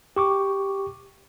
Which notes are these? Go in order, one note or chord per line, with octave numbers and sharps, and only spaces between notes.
G4 C#6 D6